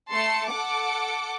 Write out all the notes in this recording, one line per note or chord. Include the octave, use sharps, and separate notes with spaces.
A3 A5 C6 C#7
A4 F#5 D6 C#7